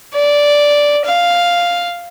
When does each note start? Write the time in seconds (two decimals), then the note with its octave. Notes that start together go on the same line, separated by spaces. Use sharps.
0.15 D5
1.06 F5